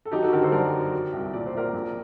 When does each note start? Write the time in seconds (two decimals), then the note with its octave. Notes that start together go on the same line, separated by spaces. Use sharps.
0.05 A4
0.12 F#3 D#4 G4
0.23 F#4 A4
0.33 D3 G4 A#4
0.42 A4 C5
0.52 F#2 A#4 D5
0.73 F#3
0.93 F#3
1.13 C2
1.33 A#2 D5
1.46 C5
1.54 A#2 A#4 D5
1.73 A#1